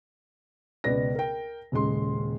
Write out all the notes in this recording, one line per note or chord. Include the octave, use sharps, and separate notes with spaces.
C#2 B2 B3 B4 D5 A#6
A#4 G5
D#1 C#3 G#3 C6